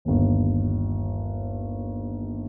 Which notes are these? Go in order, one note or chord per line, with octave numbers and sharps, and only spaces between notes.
G1 D#2